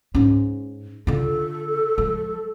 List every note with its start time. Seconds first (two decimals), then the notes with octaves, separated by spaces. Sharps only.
0.15 G#2 C#4
1.07 D3 F4 A4
1.98 F3 G#3